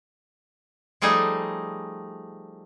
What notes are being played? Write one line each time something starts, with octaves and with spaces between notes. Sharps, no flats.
F3 G3 A3 D#4 G#4